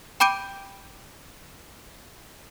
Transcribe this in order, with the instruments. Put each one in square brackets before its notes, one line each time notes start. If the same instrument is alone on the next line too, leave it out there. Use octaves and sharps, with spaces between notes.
[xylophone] G5 B5 D6 G6 D7 D#7